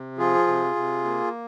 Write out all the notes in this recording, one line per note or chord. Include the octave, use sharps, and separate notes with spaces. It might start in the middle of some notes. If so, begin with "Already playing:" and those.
Already playing: C3
F3 F4 G#4
C3
C3
A#3